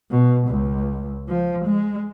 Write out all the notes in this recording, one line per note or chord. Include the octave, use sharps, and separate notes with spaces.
B2
C#2
F3
G#3